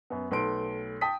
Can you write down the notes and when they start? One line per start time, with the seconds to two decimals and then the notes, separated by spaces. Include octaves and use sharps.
0.10 F#2 B3
0.31 B1 A3 B4 C6 D7
1.01 G5 A5 D#6 B6